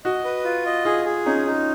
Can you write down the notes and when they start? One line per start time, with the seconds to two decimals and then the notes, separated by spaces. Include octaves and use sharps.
0.05 F#4 D#5
0.25 B4
0.44 F4
0.66 D#5
0.85 F4 G#4
1.05 G#4
1.26 C#4 D#4
1.46 D#4